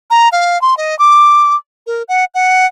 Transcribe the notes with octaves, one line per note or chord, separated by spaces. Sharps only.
A#5
F5
C6
D#5
D6
A#4
F#5
F#5